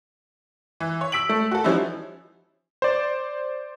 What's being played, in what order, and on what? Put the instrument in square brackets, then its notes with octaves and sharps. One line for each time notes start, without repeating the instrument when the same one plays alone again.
[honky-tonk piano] E3
C#5
E6 B6 D7 F#7
A3
F#4 A4
F3 G3 C#4 D#4 E4
[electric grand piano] C5 D5